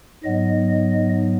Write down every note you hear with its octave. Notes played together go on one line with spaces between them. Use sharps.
G#2 F#3 B3 D#5